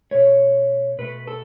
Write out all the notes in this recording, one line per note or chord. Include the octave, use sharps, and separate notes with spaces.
B2 A3 C#5
B2 A3 B4
A4